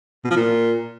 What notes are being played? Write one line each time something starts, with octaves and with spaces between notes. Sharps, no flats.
B2
F3
A#2